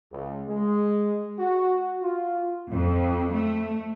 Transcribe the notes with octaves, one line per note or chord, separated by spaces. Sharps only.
C#2
G#3
F#4
F4
F2
A3